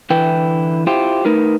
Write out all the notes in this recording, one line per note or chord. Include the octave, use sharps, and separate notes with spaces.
D3 E3 E4 B4 G5
E4 F4 G4 C5
A3 D#4 A#4 B4